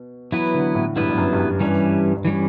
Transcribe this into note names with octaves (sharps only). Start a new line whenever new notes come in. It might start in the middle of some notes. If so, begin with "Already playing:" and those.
Already playing: B2
E3 F#3 B3 E4 B4
D3
A2
G2 F#3 B3 E4 B4
G2
F#2
G2
F#2
G2 E3 G3 C#4
G2
E3 G3 C#4